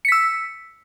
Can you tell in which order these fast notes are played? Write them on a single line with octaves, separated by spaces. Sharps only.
C#7 B6 E6